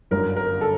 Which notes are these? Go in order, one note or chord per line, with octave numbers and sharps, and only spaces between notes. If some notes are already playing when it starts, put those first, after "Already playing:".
G1 F#2 D3 G3 A#4
A#4
A4